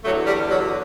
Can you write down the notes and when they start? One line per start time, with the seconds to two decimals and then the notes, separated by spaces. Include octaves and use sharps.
0.04 E2 D3 F#3 A3
0.27 G3
0.51 F#3